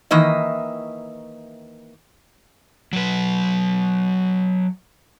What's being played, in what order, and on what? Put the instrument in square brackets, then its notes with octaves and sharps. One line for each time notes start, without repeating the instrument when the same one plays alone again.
[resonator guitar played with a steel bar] D#3 E3 A#3 D#5 E5
[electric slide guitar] F#3 B4